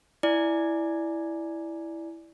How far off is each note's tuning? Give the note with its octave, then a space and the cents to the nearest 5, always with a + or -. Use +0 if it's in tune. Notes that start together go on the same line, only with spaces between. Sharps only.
E4 +0 D5 +0 G#5 +20